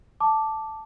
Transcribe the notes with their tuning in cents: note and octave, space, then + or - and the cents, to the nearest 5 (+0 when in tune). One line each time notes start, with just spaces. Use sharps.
A5 +0 D6 +0